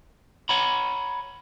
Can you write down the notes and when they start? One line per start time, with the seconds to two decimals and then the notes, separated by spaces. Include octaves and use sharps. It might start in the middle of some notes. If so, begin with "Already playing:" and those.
0.49 C#5 F#5 A#5 B5